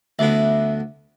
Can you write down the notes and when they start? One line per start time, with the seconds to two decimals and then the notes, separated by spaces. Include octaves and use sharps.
0.19 D2 D3 B3 E4 E5